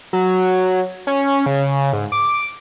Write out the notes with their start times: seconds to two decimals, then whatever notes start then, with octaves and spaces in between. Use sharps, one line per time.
0.13 F#3
1.07 C#4
1.46 C#3
1.93 G#2
2.12 D6